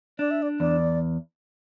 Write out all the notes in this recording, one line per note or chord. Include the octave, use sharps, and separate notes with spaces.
D4 D5
E5
D5
E2 D5